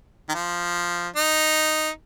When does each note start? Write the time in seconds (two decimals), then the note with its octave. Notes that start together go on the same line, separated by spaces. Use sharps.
0.29 D#3
0.34 F3
1.16 D#4